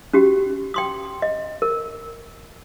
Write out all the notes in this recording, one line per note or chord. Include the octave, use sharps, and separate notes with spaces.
C#4 F#4 G4
G5 C6 D#6
D#5
A#4